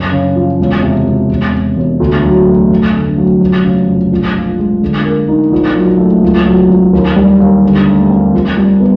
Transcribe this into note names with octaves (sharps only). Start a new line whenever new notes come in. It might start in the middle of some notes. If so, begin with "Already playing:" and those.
Already playing: F#1
C#3
F3
E1
C3
E1
E1
C3
E1
D2
F#3
A3
F1
D3
F#3
F1
C#3
F1
A#1
F3
G#3
D3
A#3
D#4
A#1
F#3
A3
C#2
F#3
C#2
D#2
G3
D#2
D3
A3
C4
F2
G3
B3